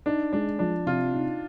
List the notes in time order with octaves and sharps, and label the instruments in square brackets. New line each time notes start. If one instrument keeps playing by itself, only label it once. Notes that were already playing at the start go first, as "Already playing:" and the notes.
[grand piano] D4 [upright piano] D#4
[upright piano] G#3 [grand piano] D4
[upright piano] F3 [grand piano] D4
[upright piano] C3 [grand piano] F4
[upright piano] D#4